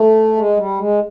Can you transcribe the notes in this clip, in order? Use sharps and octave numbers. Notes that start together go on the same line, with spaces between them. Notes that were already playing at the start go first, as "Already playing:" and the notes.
Already playing: A3
G#3
G3
G#3